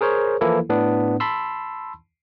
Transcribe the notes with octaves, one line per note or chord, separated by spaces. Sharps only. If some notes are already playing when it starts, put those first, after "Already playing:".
G#4 A#4 C5 C#5
E3 F3 A#3 E4 A4
A2 B3 D4
A5 B5 C6 E6